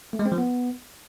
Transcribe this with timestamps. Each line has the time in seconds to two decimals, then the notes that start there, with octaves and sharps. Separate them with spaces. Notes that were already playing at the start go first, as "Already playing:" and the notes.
0.13 A3
0.19 G#3
0.26 C4
0.32 F3
0.38 B3